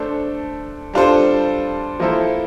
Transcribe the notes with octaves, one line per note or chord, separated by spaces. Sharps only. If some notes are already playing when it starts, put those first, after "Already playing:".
Already playing: A3 D4 A4 C5
G3 D4 F4 A4 C5
F3 A#3 E4 A4 C5